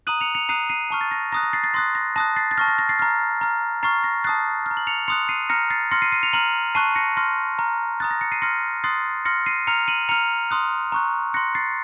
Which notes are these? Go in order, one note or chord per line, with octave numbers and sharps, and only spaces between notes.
A#5 D#6 F#6 D#7 F#7
C#7 F7
C#7 F7
A#5 D#6 F#6 C7 D#7
C7 D#7
A5 C#6 F6
A6
A#6
A#5 D#6 F#6 A#6
A#6
A6 C7
A6 C7
C6 D#6 F#6 A#6
A#6
A5 D#6 F#6 A#6
A6 C7
A6
A5 C#6 F6 A#6
A#6
A#6
A6 C7
A#5 F6
A#5 F6
A#5 C#6 F6 A6 C7
A#6
A5 D#6 F#6 A6 C7
A#5 F6
F#7
C#7 F7
C6 D#6 F#6 C#7 F7
C7 D#7
A#5 F6 A#6 C#7
A6 C7
C6 F6 A#6 C#7
C7 D#7
C7 D#7
C#7 F7
A#5 F6 D#7 F#7
A5 C#6 F#6 C7 D#7
A#6 C#7
C6 F6 A#6
A#5 F6
A#5 D#6 F#6 A6
A#6
A#6 C#7
C7 D#7
C6 F6 A#6 C#7
C6 D#6 F#6 A6 C7
C6 F6 A#6 C#7
C7 D#7
A#5 F6 C#7 F7
D#7 F#7
A#5 F6 C#7 F7
C6 D#6 F#6
A#5 C#6 F#6
C6 F#6 A#6 C#7
A6 C7